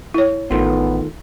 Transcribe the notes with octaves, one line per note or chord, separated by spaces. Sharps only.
E4 C#5
A1 D#3 A3 B3 F4